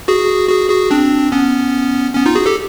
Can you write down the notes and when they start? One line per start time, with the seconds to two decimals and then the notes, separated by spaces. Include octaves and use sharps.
0.08 F#4 G#4
0.49 F#4 G#4
0.70 F#4 G#4
0.91 C4 D4
1.32 B3 C#4
2.15 B3 C#4
2.26 D#4 F4
2.35 F#4 G#4
2.46 G4 A4